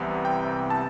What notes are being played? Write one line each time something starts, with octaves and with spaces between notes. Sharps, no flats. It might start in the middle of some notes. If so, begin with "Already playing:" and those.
Already playing: C2 C3 E3 B3
G5
A5